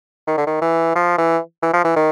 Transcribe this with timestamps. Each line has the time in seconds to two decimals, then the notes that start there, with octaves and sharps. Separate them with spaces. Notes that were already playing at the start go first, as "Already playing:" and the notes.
0.27 D#3
0.37 D3
0.47 D#3
0.61 E3
0.95 F3
1.18 E3
1.62 E3
1.73 F3
1.84 E3
1.96 D#3